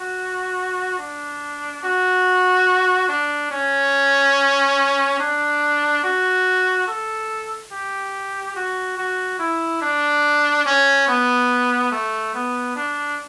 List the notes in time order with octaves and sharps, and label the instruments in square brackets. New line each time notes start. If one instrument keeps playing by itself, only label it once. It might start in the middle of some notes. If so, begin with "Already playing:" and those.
Already playing: [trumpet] F#4
D4
F#4
D4
C#4
D4
F#4
A4
G4
F#4
F#4
E4
D4
C#4
B3
A3
B3
D4